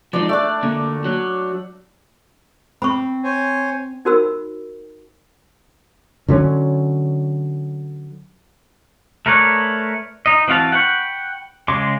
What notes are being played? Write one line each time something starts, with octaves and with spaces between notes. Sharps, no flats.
F3 G#3 D#4 D5
A3 D4 D5
D3 A#3
F#3
C4 B5 C#6
C5 C#5 G#5
D#4 F#4 A#4 C5 B5 E6
D3 F#3 A3 C#4
A3 A#4 B4 C#5 D5
D#4 D#5
E3 C4 F#4 F5 A5
F#5 G5 B5 C#6
C#3 G#3 C6 D6